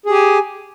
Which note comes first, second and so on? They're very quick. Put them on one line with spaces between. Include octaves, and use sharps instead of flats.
G#4 G4 G#5